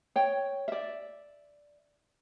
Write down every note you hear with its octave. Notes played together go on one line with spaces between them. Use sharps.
C#5 G5
D5 E5